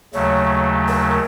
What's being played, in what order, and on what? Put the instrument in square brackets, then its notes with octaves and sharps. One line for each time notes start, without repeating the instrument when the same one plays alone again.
[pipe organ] D#2 C#3 F#3 A3 [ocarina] C#5
[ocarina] A#4